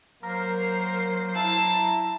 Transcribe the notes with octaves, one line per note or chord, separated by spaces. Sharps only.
F#3 A#3 A#4 C5
E4 A5 A#5